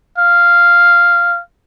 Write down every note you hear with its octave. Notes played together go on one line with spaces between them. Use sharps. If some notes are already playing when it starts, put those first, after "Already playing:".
F5